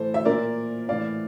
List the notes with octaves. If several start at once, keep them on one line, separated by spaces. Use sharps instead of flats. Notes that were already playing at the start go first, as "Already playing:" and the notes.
Already playing: A2 E3 A4 C5
E5
A#2 A#4 D5
A2 E3 D5 F5